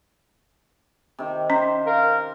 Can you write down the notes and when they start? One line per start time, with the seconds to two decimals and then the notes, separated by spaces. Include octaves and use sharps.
1.19 C3 D#3
1.50 C#4 C5
1.87 A#4 F5